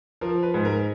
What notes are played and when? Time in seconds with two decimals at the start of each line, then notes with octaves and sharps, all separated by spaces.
0.21 F3 A#4
0.43 B4
0.54 G#2
0.65 A#4